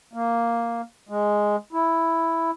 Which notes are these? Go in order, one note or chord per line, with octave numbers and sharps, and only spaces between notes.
A#3
G#3
E4